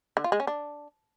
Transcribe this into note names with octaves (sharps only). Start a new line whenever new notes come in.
D3
F4
G#3
C#4
D4